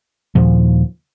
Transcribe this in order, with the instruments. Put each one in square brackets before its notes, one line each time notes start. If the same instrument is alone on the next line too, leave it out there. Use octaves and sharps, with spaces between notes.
[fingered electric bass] D#2 A#2 F3